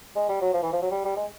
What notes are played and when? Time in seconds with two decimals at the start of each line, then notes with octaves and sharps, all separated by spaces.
0.16 G#3
0.29 G3
0.41 F#3
0.53 F3
0.63 E3
0.72 F3
0.82 F#3
0.91 G3
1.04 G3
1.16 G#3